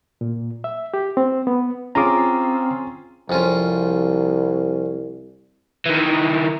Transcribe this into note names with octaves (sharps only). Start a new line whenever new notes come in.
A#2
E5
G4
C4
B3
C4 C#4 F4 G#4 A#5 D6
C2 F2 C#4 F4
D#3 E3